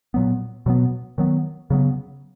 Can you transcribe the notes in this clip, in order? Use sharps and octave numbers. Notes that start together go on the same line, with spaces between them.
A#2 F#3 B3
B2 F#3 B3
D#3 F#3 B3
C#3 F#3 B3